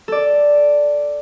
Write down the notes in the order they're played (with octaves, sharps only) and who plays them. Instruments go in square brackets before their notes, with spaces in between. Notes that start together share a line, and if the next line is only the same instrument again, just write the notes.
[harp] A4 D5